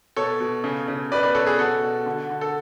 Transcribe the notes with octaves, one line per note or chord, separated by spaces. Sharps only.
B2 A4 C#5
B2
C#3
C#3
B2 B4 D5
B4 D5
B2 A4 C#5
G#4 B4
B2 F#4 A4
B2
D3
D3
A4